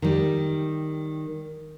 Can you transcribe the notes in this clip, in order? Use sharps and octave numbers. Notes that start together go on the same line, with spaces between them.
D#3 G3